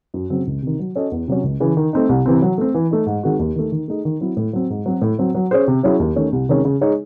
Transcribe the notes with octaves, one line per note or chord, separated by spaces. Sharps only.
F#2
C#3 F#3 C4
C#2
C3 D#3
F#3
C#4 F#4 A4 D#5
E2
C3 F#3 C#4
C#2
C#3 E3
D#3
A3 C4 D#4
C2
C3 E3 C4
F#3
A3 C4
E3
A3 D#4
G#2
D#3 G#3 C4 F#4
D#2
D#3 A3
D#3
A3 D#4 G#4
D#3
F#3 C4 E4
A2
F#3 C4
G#2
F#3 C4 F#4
A2
F#3 C4
F#3
C#4 G#4 C5
C3
F#3 C#4 E4 G#4
D#2
D#3 A3 C#4
C2
C3 D#3 G#3 C#4
C#3
G#3 D#4 G#4 C#5